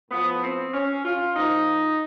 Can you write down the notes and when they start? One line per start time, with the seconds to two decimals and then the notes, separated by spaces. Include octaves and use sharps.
0.11 A2 F3 B3
0.43 C4
0.73 C#4
1.05 F4
1.36 A#2 F3 D#4